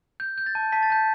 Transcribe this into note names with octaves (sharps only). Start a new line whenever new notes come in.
G6
G6
A6
A5
A5 B6
A6
A5 G6